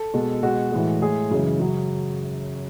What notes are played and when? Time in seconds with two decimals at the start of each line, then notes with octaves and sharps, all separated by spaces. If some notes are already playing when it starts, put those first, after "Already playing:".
Already playing: A4
0.14 B2 G#3
0.43 B2 G#3 F#4
0.72 A2 E3 G#3
1.01 A2 G#3 G#4
1.31 F#2 C#3 E3 G#3
1.60 F#2 C#3 F#3